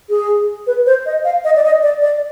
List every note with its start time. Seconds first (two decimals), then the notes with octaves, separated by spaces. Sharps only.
0.10 G#4
0.67 B4
0.86 C5
1.06 D#5
1.24 F5
1.44 D#5
1.56 D5
1.64 D#5
1.83 D5
2.02 D5